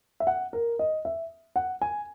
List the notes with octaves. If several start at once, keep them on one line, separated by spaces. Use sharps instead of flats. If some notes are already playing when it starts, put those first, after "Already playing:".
E5
F#5
A#4
D#5
E5
F#5
G#5